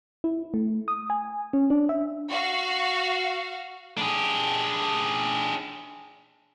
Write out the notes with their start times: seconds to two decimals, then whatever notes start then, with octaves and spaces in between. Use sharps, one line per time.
0.24 E4
0.54 A3
0.88 D#6
1.10 G#5
1.53 C#4
1.70 D4
1.89 E5
2.31 F#4 F5
3.98 D4 G#4